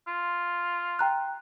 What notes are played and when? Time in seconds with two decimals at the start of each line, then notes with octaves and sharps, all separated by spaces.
0.07 F4
0.99 G5 A#5 F#6